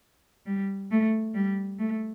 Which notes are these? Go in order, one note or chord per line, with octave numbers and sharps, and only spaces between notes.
G3
A3
G3
A3